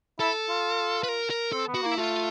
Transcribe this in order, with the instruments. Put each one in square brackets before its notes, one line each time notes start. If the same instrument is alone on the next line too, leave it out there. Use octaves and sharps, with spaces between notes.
[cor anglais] E4 [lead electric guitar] A4
[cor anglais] F4
[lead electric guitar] B4
A#4
A#4
[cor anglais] C4 [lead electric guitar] A4
[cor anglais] B3
[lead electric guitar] F#4
[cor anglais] A#3 [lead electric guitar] E4
[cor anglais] A3 [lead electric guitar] F4